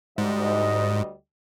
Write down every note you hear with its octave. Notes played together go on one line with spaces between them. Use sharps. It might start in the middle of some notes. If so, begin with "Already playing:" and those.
D2 G#2 G3 D#5